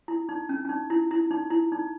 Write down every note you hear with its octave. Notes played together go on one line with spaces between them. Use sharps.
E4
D#4
C#4
C#4
D#4
E4
E4
D#4
E4
D#4